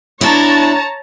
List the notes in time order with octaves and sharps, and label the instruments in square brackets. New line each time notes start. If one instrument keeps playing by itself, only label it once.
[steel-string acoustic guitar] B2 D4 E4 [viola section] C#5 A5 A#5